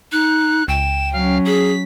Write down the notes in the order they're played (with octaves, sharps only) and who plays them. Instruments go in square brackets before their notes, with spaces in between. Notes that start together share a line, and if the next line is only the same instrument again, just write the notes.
[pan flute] D#4 [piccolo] F#6
[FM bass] C#2 [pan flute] G5 [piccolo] E7
[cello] F#3 C#4 [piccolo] F5
[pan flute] G#4 [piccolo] B6